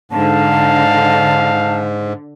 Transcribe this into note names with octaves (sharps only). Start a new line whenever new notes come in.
G#2 D3 F5 A5